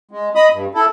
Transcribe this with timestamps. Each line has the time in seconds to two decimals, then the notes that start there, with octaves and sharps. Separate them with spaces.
0.11 G#3
0.35 D#5 B5 D#6
0.52 G2
0.75 E4 A4